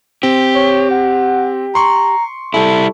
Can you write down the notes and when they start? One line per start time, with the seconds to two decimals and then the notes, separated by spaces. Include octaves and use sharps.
0.23 C4 G4
0.55 C#5
0.91 F#5
1.75 A#5 C6 C#6
2.54 G3 E4 A4